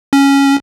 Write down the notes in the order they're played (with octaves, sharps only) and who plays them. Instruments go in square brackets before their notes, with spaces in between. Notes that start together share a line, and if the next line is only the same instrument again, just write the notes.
[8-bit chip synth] C#4